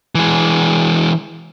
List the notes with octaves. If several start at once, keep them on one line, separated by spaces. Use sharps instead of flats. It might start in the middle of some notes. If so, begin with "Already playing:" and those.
E3 G#3